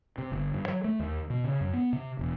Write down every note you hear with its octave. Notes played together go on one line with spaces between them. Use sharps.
C3
G1
G2
F#3
A3
D#2
B2
C#3
F#2
B3
C3
E1